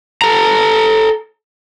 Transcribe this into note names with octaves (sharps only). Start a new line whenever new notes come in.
A4 A#5